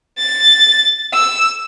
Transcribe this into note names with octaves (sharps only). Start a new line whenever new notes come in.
A6
E6